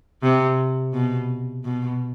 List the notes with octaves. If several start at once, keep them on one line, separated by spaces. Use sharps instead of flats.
C3
B2
B2